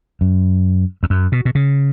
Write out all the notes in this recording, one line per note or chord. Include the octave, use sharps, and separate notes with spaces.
F#2
E2
F#2
B2
B2
C#3